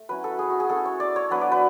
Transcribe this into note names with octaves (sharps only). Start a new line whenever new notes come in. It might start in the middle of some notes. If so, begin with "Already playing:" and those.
Already playing: A3
F#3 C#4 E4 B4
A4
G#4
F#4
G#4
A3 C#4 E4 A4
C#5
D5
C#5
F#3 B3 D4 B4
D5
B4